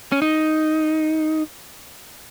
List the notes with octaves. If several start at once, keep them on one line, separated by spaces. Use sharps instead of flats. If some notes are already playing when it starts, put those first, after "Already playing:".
C#4
D#4